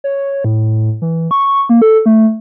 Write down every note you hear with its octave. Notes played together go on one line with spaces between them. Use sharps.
C#5
A2
E3
C#6
A#3
A4
A3